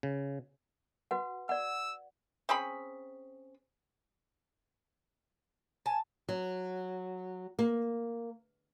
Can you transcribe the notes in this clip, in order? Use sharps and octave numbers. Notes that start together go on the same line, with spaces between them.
C#3
F#4 B4 F#5
D5 F#5 E6
C4 C#4 G#4 B5
G#5 A5
F#3
A#3